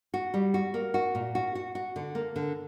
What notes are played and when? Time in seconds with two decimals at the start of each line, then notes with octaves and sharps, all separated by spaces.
0.14 F#4
0.34 G3
0.54 F#4
0.74 A#3
0.94 F#4
1.15 A#2
1.35 F#4
1.55 F#4
1.75 F#4
1.96 D3
2.15 A#3
2.36 D3